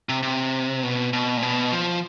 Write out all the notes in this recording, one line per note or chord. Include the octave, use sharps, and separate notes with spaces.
C3
C3
B2
B2
A#2
B2
F3